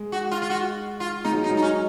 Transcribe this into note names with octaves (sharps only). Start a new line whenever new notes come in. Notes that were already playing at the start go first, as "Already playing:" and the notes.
Already playing: G#3
F#4
F4
F4
F#4
F4
G#3 D#4
F#3
D#4
F#3
D#4
C#4